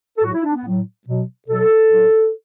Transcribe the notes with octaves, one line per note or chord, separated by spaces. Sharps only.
A4
A2 F#3 F#4
E4
D4
B3
A2 F#3
B2 F#3
B2 F#3 A4
A2 F#3